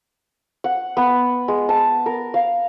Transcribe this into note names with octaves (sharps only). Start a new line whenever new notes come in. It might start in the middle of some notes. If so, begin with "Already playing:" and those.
F#5
B3
G#3
A5
A#4
F5